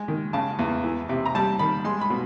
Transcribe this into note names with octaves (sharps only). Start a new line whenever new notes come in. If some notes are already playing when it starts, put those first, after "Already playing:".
Already playing: G#3
D#3
C#3 A5
E2
E3
C3
A#5
G3 A5
D#3 B5
G#3 C6
B5
B2